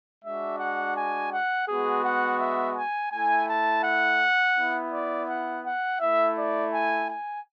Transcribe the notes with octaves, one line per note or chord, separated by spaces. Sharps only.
G#3 D4 F#4 E5
F#5
G#5
F#5
G#3 B3 F#4 G#4
F#5
E5
G#5
A3 E4 G#5
A5
F#5
B3 E4
D5
F#5
F#5
A3 E4 E5
D5
G#5
G#5